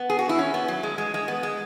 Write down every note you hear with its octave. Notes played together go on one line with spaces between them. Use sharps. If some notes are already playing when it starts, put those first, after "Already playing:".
Already playing: B3
G#4
F#4
E4
C#4
B3
F#3
G#3
G#3
G#3
B3
G#3